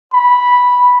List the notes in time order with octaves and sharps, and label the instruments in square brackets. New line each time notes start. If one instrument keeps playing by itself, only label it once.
[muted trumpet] B5